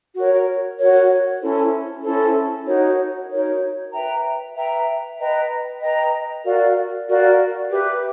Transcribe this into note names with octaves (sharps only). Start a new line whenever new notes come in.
F#4 A#4 C#5
F#4 A#4 C#5
C#4 E4 A4 C5
C#4 E4 A4 C5
D#4 F#4 A#4 C#5
D#4 F#4 A#4 C#5
B4 E5 G5 A#5
B4 E5 G5 A#5
B4 D#5 G5 A#5
B4 D#5 G5 A#5
F#4 A#4 D5 F5
F#4 A#4 D5 F5
G4 B4 E5